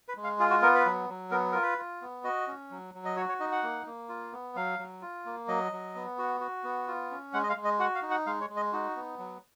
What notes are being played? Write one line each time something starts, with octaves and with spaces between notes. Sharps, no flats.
B4
G#3
F5
F4 G#4
F#4
B3 A#4
B4
F#3
F#3
B3 A#4
F4 A#4
B4
F4
B3
F#4 D#5
C#4
F#3
F#3
D#5
F#4 C#5
C#5
D#4 D#5
F#5
A#3
A#3
F4
B3
F#3 F5
F#3
F4
A#3
F#3 D#5
F#3
B3
F#4
F#4
B3
F4
C#4
G#3 F#5
D#5
F5
G#3
D#5
F#4 F#5
F5
D#4
F#5
G#3 F5
C#5
G#3
D#5
D#4 F#4
B3
F#3